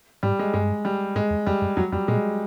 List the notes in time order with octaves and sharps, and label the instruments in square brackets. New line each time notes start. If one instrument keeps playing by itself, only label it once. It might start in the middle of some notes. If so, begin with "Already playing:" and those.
[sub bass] G#2 [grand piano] G3
[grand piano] G#3
[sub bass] G2 [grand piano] G#3
[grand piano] G3
[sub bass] G#2 [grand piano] G#3
[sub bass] E2
[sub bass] F2 [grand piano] G3
[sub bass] F#2
[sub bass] F2 [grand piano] F#3
[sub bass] F2 [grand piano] G3
[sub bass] A#2 [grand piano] G#3